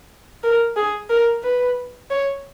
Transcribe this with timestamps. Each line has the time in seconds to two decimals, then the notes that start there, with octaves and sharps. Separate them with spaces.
0.43 A#4
0.76 G#4
1.09 A#4
1.43 B4
2.10 C#5